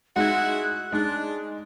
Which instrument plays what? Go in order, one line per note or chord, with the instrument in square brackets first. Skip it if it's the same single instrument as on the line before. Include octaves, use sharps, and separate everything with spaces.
[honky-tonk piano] G#3 D#4 [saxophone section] E4 F#4 [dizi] F#6
[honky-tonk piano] G#3 D#4 [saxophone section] D4